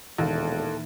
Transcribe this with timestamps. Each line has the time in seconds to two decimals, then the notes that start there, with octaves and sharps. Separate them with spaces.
0.18 E1 D#2 A#2 D#3 E3 A4